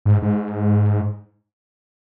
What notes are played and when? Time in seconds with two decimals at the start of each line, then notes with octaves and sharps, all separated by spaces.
0.05 G#2
0.22 G#2